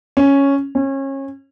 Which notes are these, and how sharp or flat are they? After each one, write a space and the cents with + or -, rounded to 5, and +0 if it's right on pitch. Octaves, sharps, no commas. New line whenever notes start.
C#4 +0
C#4 -30